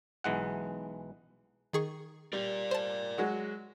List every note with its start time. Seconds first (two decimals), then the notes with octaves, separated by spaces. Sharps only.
0.24 B1 E3 G#3 F#5
1.73 D#3 G#4 C#6
2.33 G3 A#4 D5
2.71 C5 A5
3.18 F#3 G#3 F#4